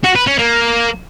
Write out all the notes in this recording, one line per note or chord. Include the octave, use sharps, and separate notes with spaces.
F#4
B4
C#4
A#3